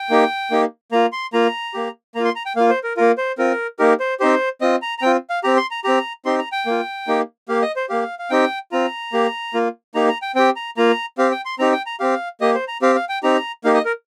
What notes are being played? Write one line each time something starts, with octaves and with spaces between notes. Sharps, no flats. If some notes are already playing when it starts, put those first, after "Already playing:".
Already playing: G5
A#3 D#4 G4
A#3 D#4 G4
A#3 F4 A#5
C6
A#3 F4 A#5
A#3 G4
A#3 F4 A#5
C6
A#5
G5
A#3 F4 F5
C5
A#4
A#3 F4 A#4
C5
C4 F4 A#4
A#3 D#4 G4 A#4
C5
C4 D#4 G4 C5
C4 F4 D#5
A#5
A#5
C4 F4 G5
F5
C4 G4 A#5
C6
A#5
C4 G4 A#5
C4 D#4 G4 C6
A#5
G5
A#3 F4
A#3 D#4 G4
A#3 G4 F5
D#5
C5
A#3 G4 F5
F5
C4 D#4 G4 G5
C4 F4 A#5
A#3 G4
A#3 F4
A#3 D#4 G4 A#5
A#5
G5
C4 G4 G5
A#5
A#3 F4 A#5
C4 G4 F5
G5
C6
C4 D#4 G4 A#5
G5
A#5
C4 G4 F5
A#3 G4 D#5
C5
A#5
C4 G4 F5
F5
G5
C4 D#4 G4 A#5
A#3 D#4 G4 F5
D#5
A#4